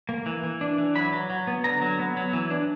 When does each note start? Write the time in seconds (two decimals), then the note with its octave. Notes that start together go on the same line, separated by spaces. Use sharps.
0.09 A#3
0.26 E3
0.43 E3
0.61 D4
0.78 E3
0.95 F#3 B5
1.13 F#3
1.30 F#3
1.47 B3
1.64 D3 A#5
1.81 F#3
1.99 B3
2.17 F#3
2.33 E3
2.50 D4